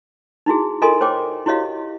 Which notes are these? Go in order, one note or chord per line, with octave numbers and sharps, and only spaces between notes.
D#4 E4 F#4 G#4
F4 A4 A#4 D#5 G#5 C6
C5 C#5 G5 D6
E4 F#4 G4 C#5 D#5 F5